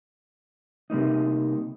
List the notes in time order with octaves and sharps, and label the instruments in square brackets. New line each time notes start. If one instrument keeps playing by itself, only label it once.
[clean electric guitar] C3 G3 A#3 D#4